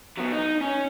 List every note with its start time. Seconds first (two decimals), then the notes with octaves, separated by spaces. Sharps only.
0.18 F#3 B3
0.33 D#4
0.61 C#4